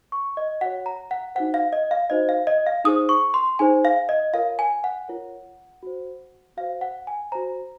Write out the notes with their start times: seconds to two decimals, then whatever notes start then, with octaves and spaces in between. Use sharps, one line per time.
0.12 C#6
0.37 D#5
0.61 F#4 C#5 F#5
0.86 A#5
1.11 F#5
1.35 D#4 F#4 C5 F#5
1.54 F5
1.73 D#5
1.91 F5
2.10 D#4 F#4 C5 D#5
2.29 F5
2.47 D#5
2.66 F5
2.85 D#4 G#4 C5 D#6
3.09 C#6
3.34 C6
3.59 D#4 G#4 C5 G#5
3.85 F5
4.09 D#5
4.33 F4 A#4 C#5 F5
4.59 G#5
4.84 F#5
5.09 F4 A#4 C#5
5.83 F#4 C5
6.57 F#4 C5 F5
6.81 F#5
7.07 G#5
7.32 F#4 C5 A#5